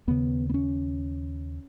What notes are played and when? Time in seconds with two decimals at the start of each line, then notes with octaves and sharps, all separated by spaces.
0.07 D#2 C#3 B3
0.49 B3
0.54 C#4